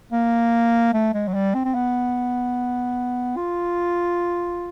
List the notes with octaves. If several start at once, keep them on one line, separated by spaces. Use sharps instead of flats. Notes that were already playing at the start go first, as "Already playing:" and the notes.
A#3
A3
G#3
F#3
G3
C4
C4
B3
F4